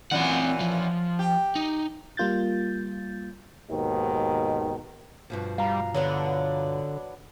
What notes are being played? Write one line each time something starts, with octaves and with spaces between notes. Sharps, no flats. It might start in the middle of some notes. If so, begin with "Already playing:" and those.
F#2 A#2 E3 C4 F#5
F3
G4
D#4
G3 A#3 F4 G6 A6
D#2 G#2 B2 D#3
G2 B2 F3
G3 F5 A#5
D3 F#3 B3 D4